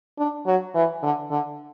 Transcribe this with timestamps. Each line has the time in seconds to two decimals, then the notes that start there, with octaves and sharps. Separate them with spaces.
0.19 D4
0.46 F#3
0.75 E3
1.03 D3
1.31 D3